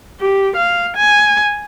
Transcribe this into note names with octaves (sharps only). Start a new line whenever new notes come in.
G4
F5
G#5